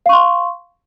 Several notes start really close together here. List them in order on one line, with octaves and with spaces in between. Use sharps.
F5 C#6 C6